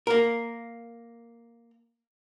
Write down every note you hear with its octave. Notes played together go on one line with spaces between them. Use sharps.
A#3 A#4